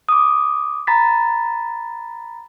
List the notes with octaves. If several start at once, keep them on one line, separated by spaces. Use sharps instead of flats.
D6 D#6
A#5 B5 A6 B6